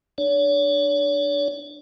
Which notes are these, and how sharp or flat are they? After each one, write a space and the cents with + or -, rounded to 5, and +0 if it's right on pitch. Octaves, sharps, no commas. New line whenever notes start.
D4 +25 C#5 +40